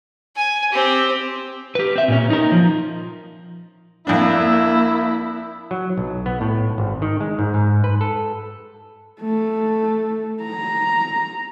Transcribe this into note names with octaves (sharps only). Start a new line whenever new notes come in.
G#5
C4 G4
G4 B4
C4 E5
A#2 C#4
D#4 A#4
F3
F2 A#3 D4 E4
F#3
B1
B3
A2
G#1
D#3
G#3
G#2
G#2
B4
A4
A3
A#5